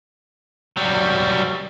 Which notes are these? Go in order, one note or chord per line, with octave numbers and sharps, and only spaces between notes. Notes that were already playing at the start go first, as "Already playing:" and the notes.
F#3 G3